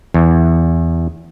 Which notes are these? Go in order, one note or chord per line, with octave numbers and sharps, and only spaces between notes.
E2